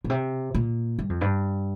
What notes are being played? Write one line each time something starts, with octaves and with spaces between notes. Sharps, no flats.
A#2
C3
A#2
G2
F2
G2